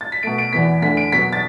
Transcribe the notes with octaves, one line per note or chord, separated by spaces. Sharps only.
A6
B6
B2 A3 D7
D7
E2 E3 B3 B6
E2 D3 A3 B6
D7
B2 F#3 B3 B6
A6